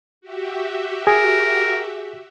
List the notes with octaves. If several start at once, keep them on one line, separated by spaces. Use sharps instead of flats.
F#4 G4 E5
G#4 A#4